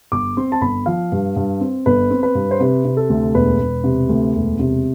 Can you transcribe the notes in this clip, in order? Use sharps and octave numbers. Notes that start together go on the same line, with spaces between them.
G1 D6
C4 C6
A5
G1 B5
F3 F5
G2
G2
C4
G1 B4
C4
B4
G2
C5
C3 B4
C3
A4
D2
E1 B4
E1
C3
D2
E1
C3